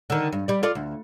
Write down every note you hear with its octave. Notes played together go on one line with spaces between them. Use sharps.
D3 D#3
G2
G3 D5
F4 A4 D5
D2